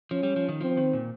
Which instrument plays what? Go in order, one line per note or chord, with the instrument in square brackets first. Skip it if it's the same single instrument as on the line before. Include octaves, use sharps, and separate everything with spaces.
[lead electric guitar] F3 [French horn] C#4
[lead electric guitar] G3
F3
D#3
[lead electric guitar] F3 [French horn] C4
[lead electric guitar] D#3
A#2